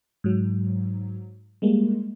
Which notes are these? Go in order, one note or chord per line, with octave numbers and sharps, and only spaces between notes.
G#2 F#3
G3 G#3 A#3